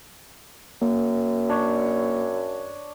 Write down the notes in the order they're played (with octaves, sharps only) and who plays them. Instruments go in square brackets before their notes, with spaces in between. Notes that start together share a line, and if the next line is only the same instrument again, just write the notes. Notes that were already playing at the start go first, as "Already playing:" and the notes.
[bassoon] F#2 [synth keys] A#3
[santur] D4 C#5